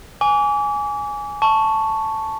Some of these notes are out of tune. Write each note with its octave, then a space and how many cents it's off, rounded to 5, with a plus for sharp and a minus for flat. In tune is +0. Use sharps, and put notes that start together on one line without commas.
G#5 +0 D6 -35
A5 +0 C#6 +0